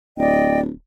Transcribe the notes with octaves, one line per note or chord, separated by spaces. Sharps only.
D1 D5 D#5 G5